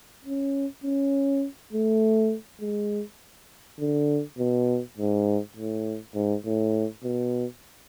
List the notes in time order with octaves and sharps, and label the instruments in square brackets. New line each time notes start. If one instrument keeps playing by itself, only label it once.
[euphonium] C#4
C#4
A3
G#3
D3
B2
G#2
A2
G#2
A2
B2